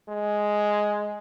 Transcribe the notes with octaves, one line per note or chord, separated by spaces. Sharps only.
G#3